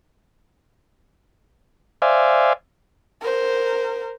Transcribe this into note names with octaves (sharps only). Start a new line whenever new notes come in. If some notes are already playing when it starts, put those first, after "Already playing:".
C5 D5 E5 F5 G#5
A#4 C5